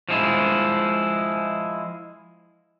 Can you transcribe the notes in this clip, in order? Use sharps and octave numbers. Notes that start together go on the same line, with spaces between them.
F3 G#3 E4